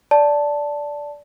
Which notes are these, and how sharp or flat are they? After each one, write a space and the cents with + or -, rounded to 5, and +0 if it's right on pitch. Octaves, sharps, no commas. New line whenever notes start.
D5 -10 A5 +0